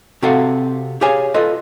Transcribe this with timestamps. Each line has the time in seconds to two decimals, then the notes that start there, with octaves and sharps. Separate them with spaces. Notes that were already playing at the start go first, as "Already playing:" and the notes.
0.22 C3 C4 F#4 A4 F5 F#5
1.01 G4 G#4 C#5 F5 G#5
1.34 F4 A4 B4 D#5